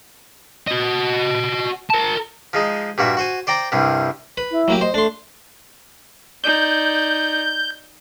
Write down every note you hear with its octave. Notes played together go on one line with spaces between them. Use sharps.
F#4 D#5
A#4 A5
F3 G#3 D#4
G2 A#2 F#4 E5
F#4 C5 G#5
C5 D5 G5 A#5
C2 G2 C3
B4
E4
F#3 A#3 G4
C5 D#5
A3 D4 C6
D#4 D5 G6